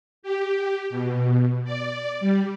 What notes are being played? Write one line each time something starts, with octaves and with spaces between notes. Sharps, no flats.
G4
B2
D5
G3